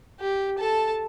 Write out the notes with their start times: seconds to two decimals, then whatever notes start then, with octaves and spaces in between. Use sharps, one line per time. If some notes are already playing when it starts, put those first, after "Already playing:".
0.20 G4
0.59 A4 A5